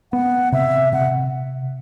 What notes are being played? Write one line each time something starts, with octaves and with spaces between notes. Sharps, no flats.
B3 F#5
C3 E5
C3 F#5